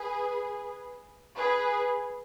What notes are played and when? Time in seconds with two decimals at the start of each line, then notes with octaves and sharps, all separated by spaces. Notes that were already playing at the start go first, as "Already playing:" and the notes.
Already playing: G#4 B4
1.35 G#4 B4